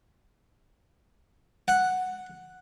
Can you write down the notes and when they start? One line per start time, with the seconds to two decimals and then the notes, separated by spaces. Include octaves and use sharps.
1.68 F#5